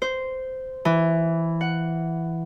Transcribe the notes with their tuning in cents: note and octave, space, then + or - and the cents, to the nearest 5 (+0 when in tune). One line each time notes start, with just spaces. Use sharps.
C5 -10
E3 +5
F#5 +5